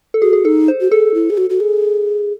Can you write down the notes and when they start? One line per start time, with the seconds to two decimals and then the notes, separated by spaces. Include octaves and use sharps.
0.14 A4
0.22 F#4 G#4
0.33 G#4
0.45 D#4 A4
0.68 C5
0.81 F#4
0.91 G#4 A4
1.14 E4
1.30 G#4
1.37 F#4
1.50 F#4
1.60 G#4